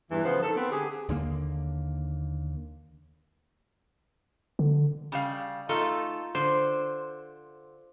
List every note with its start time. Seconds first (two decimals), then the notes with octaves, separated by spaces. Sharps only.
0.11 E2 G2 E3
0.25 C#3 F3 B3 C5
0.43 D#3 A4
0.57 B3 C4
0.72 D3 G4 G#4
1.09 D#2 D3 F3 A#3
4.59 D3
5.12 C#3 G3 F5
5.69 A3 D#4 F4 A4
6.35 D3 C5